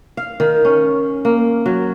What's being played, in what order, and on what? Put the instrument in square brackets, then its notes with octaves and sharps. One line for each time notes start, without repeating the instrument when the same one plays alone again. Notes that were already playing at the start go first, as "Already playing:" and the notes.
[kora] F5
D#3
C#4
A#3
F#3